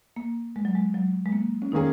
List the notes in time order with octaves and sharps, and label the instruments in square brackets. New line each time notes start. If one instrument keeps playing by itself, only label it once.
[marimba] A#3
G#3
F#3
G#3
F#3
G#3
A#3
C#4
[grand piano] D#3 A#3 C#4 G#4 [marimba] D#4